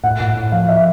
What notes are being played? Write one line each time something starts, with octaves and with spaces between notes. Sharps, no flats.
A2 F#5
A2
A2
F3 F5
E5